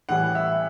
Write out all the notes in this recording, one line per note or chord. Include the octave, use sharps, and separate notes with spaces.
A2 E3 G3 F#5
E5